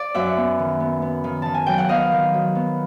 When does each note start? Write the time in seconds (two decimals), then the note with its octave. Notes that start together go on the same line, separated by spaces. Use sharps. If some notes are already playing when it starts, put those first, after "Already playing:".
Already playing: D5
0.14 F#2 E5 F#5
0.37 B3
0.59 D#3
0.80 B3
1.02 B3
1.24 D#3
1.42 D#3 A5
1.54 G#5
1.66 F#3 G5
1.78 F#5
1.89 B3 D#5 F5
2.12 D#3
2.34 F#3
2.55 B3